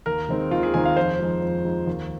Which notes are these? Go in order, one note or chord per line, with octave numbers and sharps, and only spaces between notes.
D#2 A#4
D#3 G#3 C4 D#4
D#2 F4
G#4
D#3 G#3 C4 D#4 G#5
F5
F2 C5
F3 G#3 D#4
F2
F3 G#3 D#4
D#2